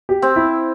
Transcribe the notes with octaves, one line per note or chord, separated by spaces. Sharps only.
G4
C4
E4